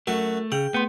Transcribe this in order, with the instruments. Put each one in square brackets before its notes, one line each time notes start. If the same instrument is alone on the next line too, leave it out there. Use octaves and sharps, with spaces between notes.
[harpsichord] F#2 F#4 [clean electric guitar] A3
[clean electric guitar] C#3 [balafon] G#4 [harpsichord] G5
[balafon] A3 C6 [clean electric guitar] B3